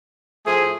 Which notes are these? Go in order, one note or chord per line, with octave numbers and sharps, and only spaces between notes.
A2 F3 A3 G#4